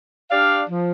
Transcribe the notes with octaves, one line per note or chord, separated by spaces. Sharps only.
D4 G4 D5 F5
F3